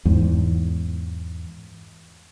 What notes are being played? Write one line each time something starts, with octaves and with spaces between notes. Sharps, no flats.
E2 G#2